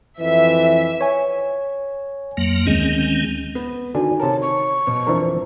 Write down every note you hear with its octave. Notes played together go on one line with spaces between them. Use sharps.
F2 E3 E5
C#5 G#5
F2 F#3 A#3
D2 D#3 G#3 C4 C#4
B3
D3 D#3 D4 F#4 G#5
C3 A#4 C#5 A5
C#6
B2
F2 E3 D4 A#4 C5